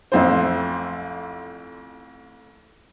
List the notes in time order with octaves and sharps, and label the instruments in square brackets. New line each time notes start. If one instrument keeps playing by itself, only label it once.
[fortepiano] A1 F2 C5